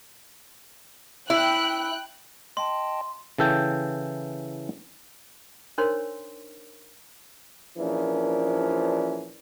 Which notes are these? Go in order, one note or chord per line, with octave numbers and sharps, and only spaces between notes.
E4 G5 F#6
D#5 G5 A5 C6
C#3 E3 A4 G5
D4 D#4 A#4 C5 C#5 C6
A#1 E3 F3 C#4 D4 A#4